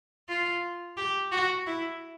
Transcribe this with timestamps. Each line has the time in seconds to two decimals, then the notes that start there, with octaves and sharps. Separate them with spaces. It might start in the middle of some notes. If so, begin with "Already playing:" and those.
0.29 F4
0.97 G4
1.32 F#4
1.67 E4